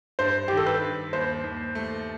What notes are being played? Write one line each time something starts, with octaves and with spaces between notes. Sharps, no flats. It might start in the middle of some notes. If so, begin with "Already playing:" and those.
G2 C5
D#3 G4
A4
B4
G2
D#2 C5
D#2
A3